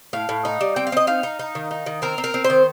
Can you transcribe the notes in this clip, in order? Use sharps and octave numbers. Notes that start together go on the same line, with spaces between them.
A2 F5
A2
D#4
G3
C4 G5
F5
C4 D#5
D#4 F5
D#4
D#4
D#3
D#4
D#3
C4 A#4
C4
A#4
C4
C5
D#3